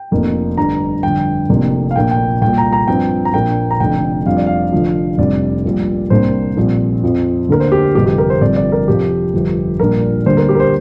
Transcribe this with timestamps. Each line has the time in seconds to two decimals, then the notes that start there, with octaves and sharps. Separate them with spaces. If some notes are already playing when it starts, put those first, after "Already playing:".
Already playing: G5
0.11 F1 F2 C3 A#3 D4
0.57 G1 G2 D3 G3 D4 A#5
1.03 G1 F2 D3 G5
1.49 F1 F2 C3 A#3 D4
1.91 F5
1.96 A#1 A#2 A#3 D4 G5
2.11 G5
2.42 C2 A#2 A#3 G5
2.58 A#5
2.73 A#5
2.88 G2 F3 C4 G5
3.25 A#5
3.34 A#1 A#2 F3 A#3 D4 G5
3.71 A#5
3.80 F1 F2 D3 G5
4.26 F2 D3 G3 C4 F5
4.37 D5
4.47 F5
4.72 F1 F2 D3 F3
5.18 F1 F2 C3 G3 D4 D5
5.65 A#1 A#2 G3
6.10 C2 C3 A#3 D4 C5
6.57 A#1 A#2 G3 C4
7.03 F2 F3 C4
7.49 D2 D3 A#3 A#4
7.60 C5
7.72 G4
7.95 G1 F2 C3 G4
8.06 G4
8.18 A#4
8.30 C5
8.41 G1 F2 C3 D5
8.57 D5
8.72 A#4
8.88 F2 C3 F3 G4
9.34 G1 F2 F3
9.80 A#1 A#2 G3 D4 A#4
10.26 D2 D3 G3 A#3 C5
10.37 A#4
10.49 G4
10.55 A#4
10.60 C5